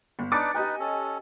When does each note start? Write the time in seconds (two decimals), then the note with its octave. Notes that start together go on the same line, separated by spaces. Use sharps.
0.19 G1
0.32 D4 D#4 B4 D6 A6 C#7
0.54 D#4 G4 B4 D#5 G#5
0.80 C#4 A4